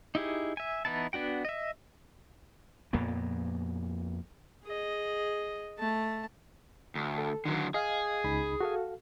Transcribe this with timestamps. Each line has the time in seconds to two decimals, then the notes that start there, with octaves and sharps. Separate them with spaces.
0.15 D#4 E4 G4 G#4
0.57 E5 G#5
0.85 E3 B3 D#4 E4 A5
1.13 B3 D4 F#4 G5
1.45 D#5 E5
2.93 F2 A#2 A#3 B3
4.64 G#4 D#5
5.79 A3 A5
6.95 D2
7.18 A4
7.45 D3 D#3 F#3
7.74 G#4 D#5 F5
8.24 C#2 D#4 B5
8.61 F#4 A4 F5